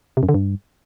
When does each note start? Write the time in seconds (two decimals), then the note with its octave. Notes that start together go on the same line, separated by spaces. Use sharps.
0.17 C3
0.23 F#2
0.29 D3
0.34 G2